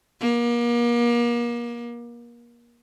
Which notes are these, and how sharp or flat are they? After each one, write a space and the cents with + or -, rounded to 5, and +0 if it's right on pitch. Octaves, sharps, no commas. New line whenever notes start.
A#3 +35